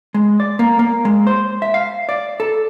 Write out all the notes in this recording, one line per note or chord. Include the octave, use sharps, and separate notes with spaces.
G#3
D5
A#3
A#3
G#3
C5
E5
F5
D5
A4